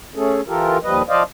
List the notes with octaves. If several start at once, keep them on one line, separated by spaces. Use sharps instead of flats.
A3 C#4 G#4 A4
E3 F4 G4 A4 A#4
D#2 F3 G3 B4 D#5
F3 C5 D5 D#5 F5